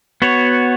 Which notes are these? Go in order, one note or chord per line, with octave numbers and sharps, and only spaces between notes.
B3 F#4 C#5